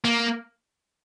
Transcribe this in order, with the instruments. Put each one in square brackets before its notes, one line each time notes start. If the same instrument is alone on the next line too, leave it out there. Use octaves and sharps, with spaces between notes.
[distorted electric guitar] A#3